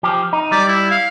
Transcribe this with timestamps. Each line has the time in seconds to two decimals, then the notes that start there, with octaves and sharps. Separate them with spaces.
0.03 F3 G4
0.33 D#4
0.52 G3 D5
0.68 E4
0.91 F5